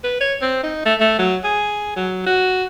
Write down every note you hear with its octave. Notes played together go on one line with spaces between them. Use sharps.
B4
C#5
C4
D#4
A3
A3
F#3
G#4
F#3
F#4